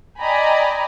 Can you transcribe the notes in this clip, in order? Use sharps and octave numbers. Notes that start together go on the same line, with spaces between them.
D5 D#5 G5 G#5 A#5 B5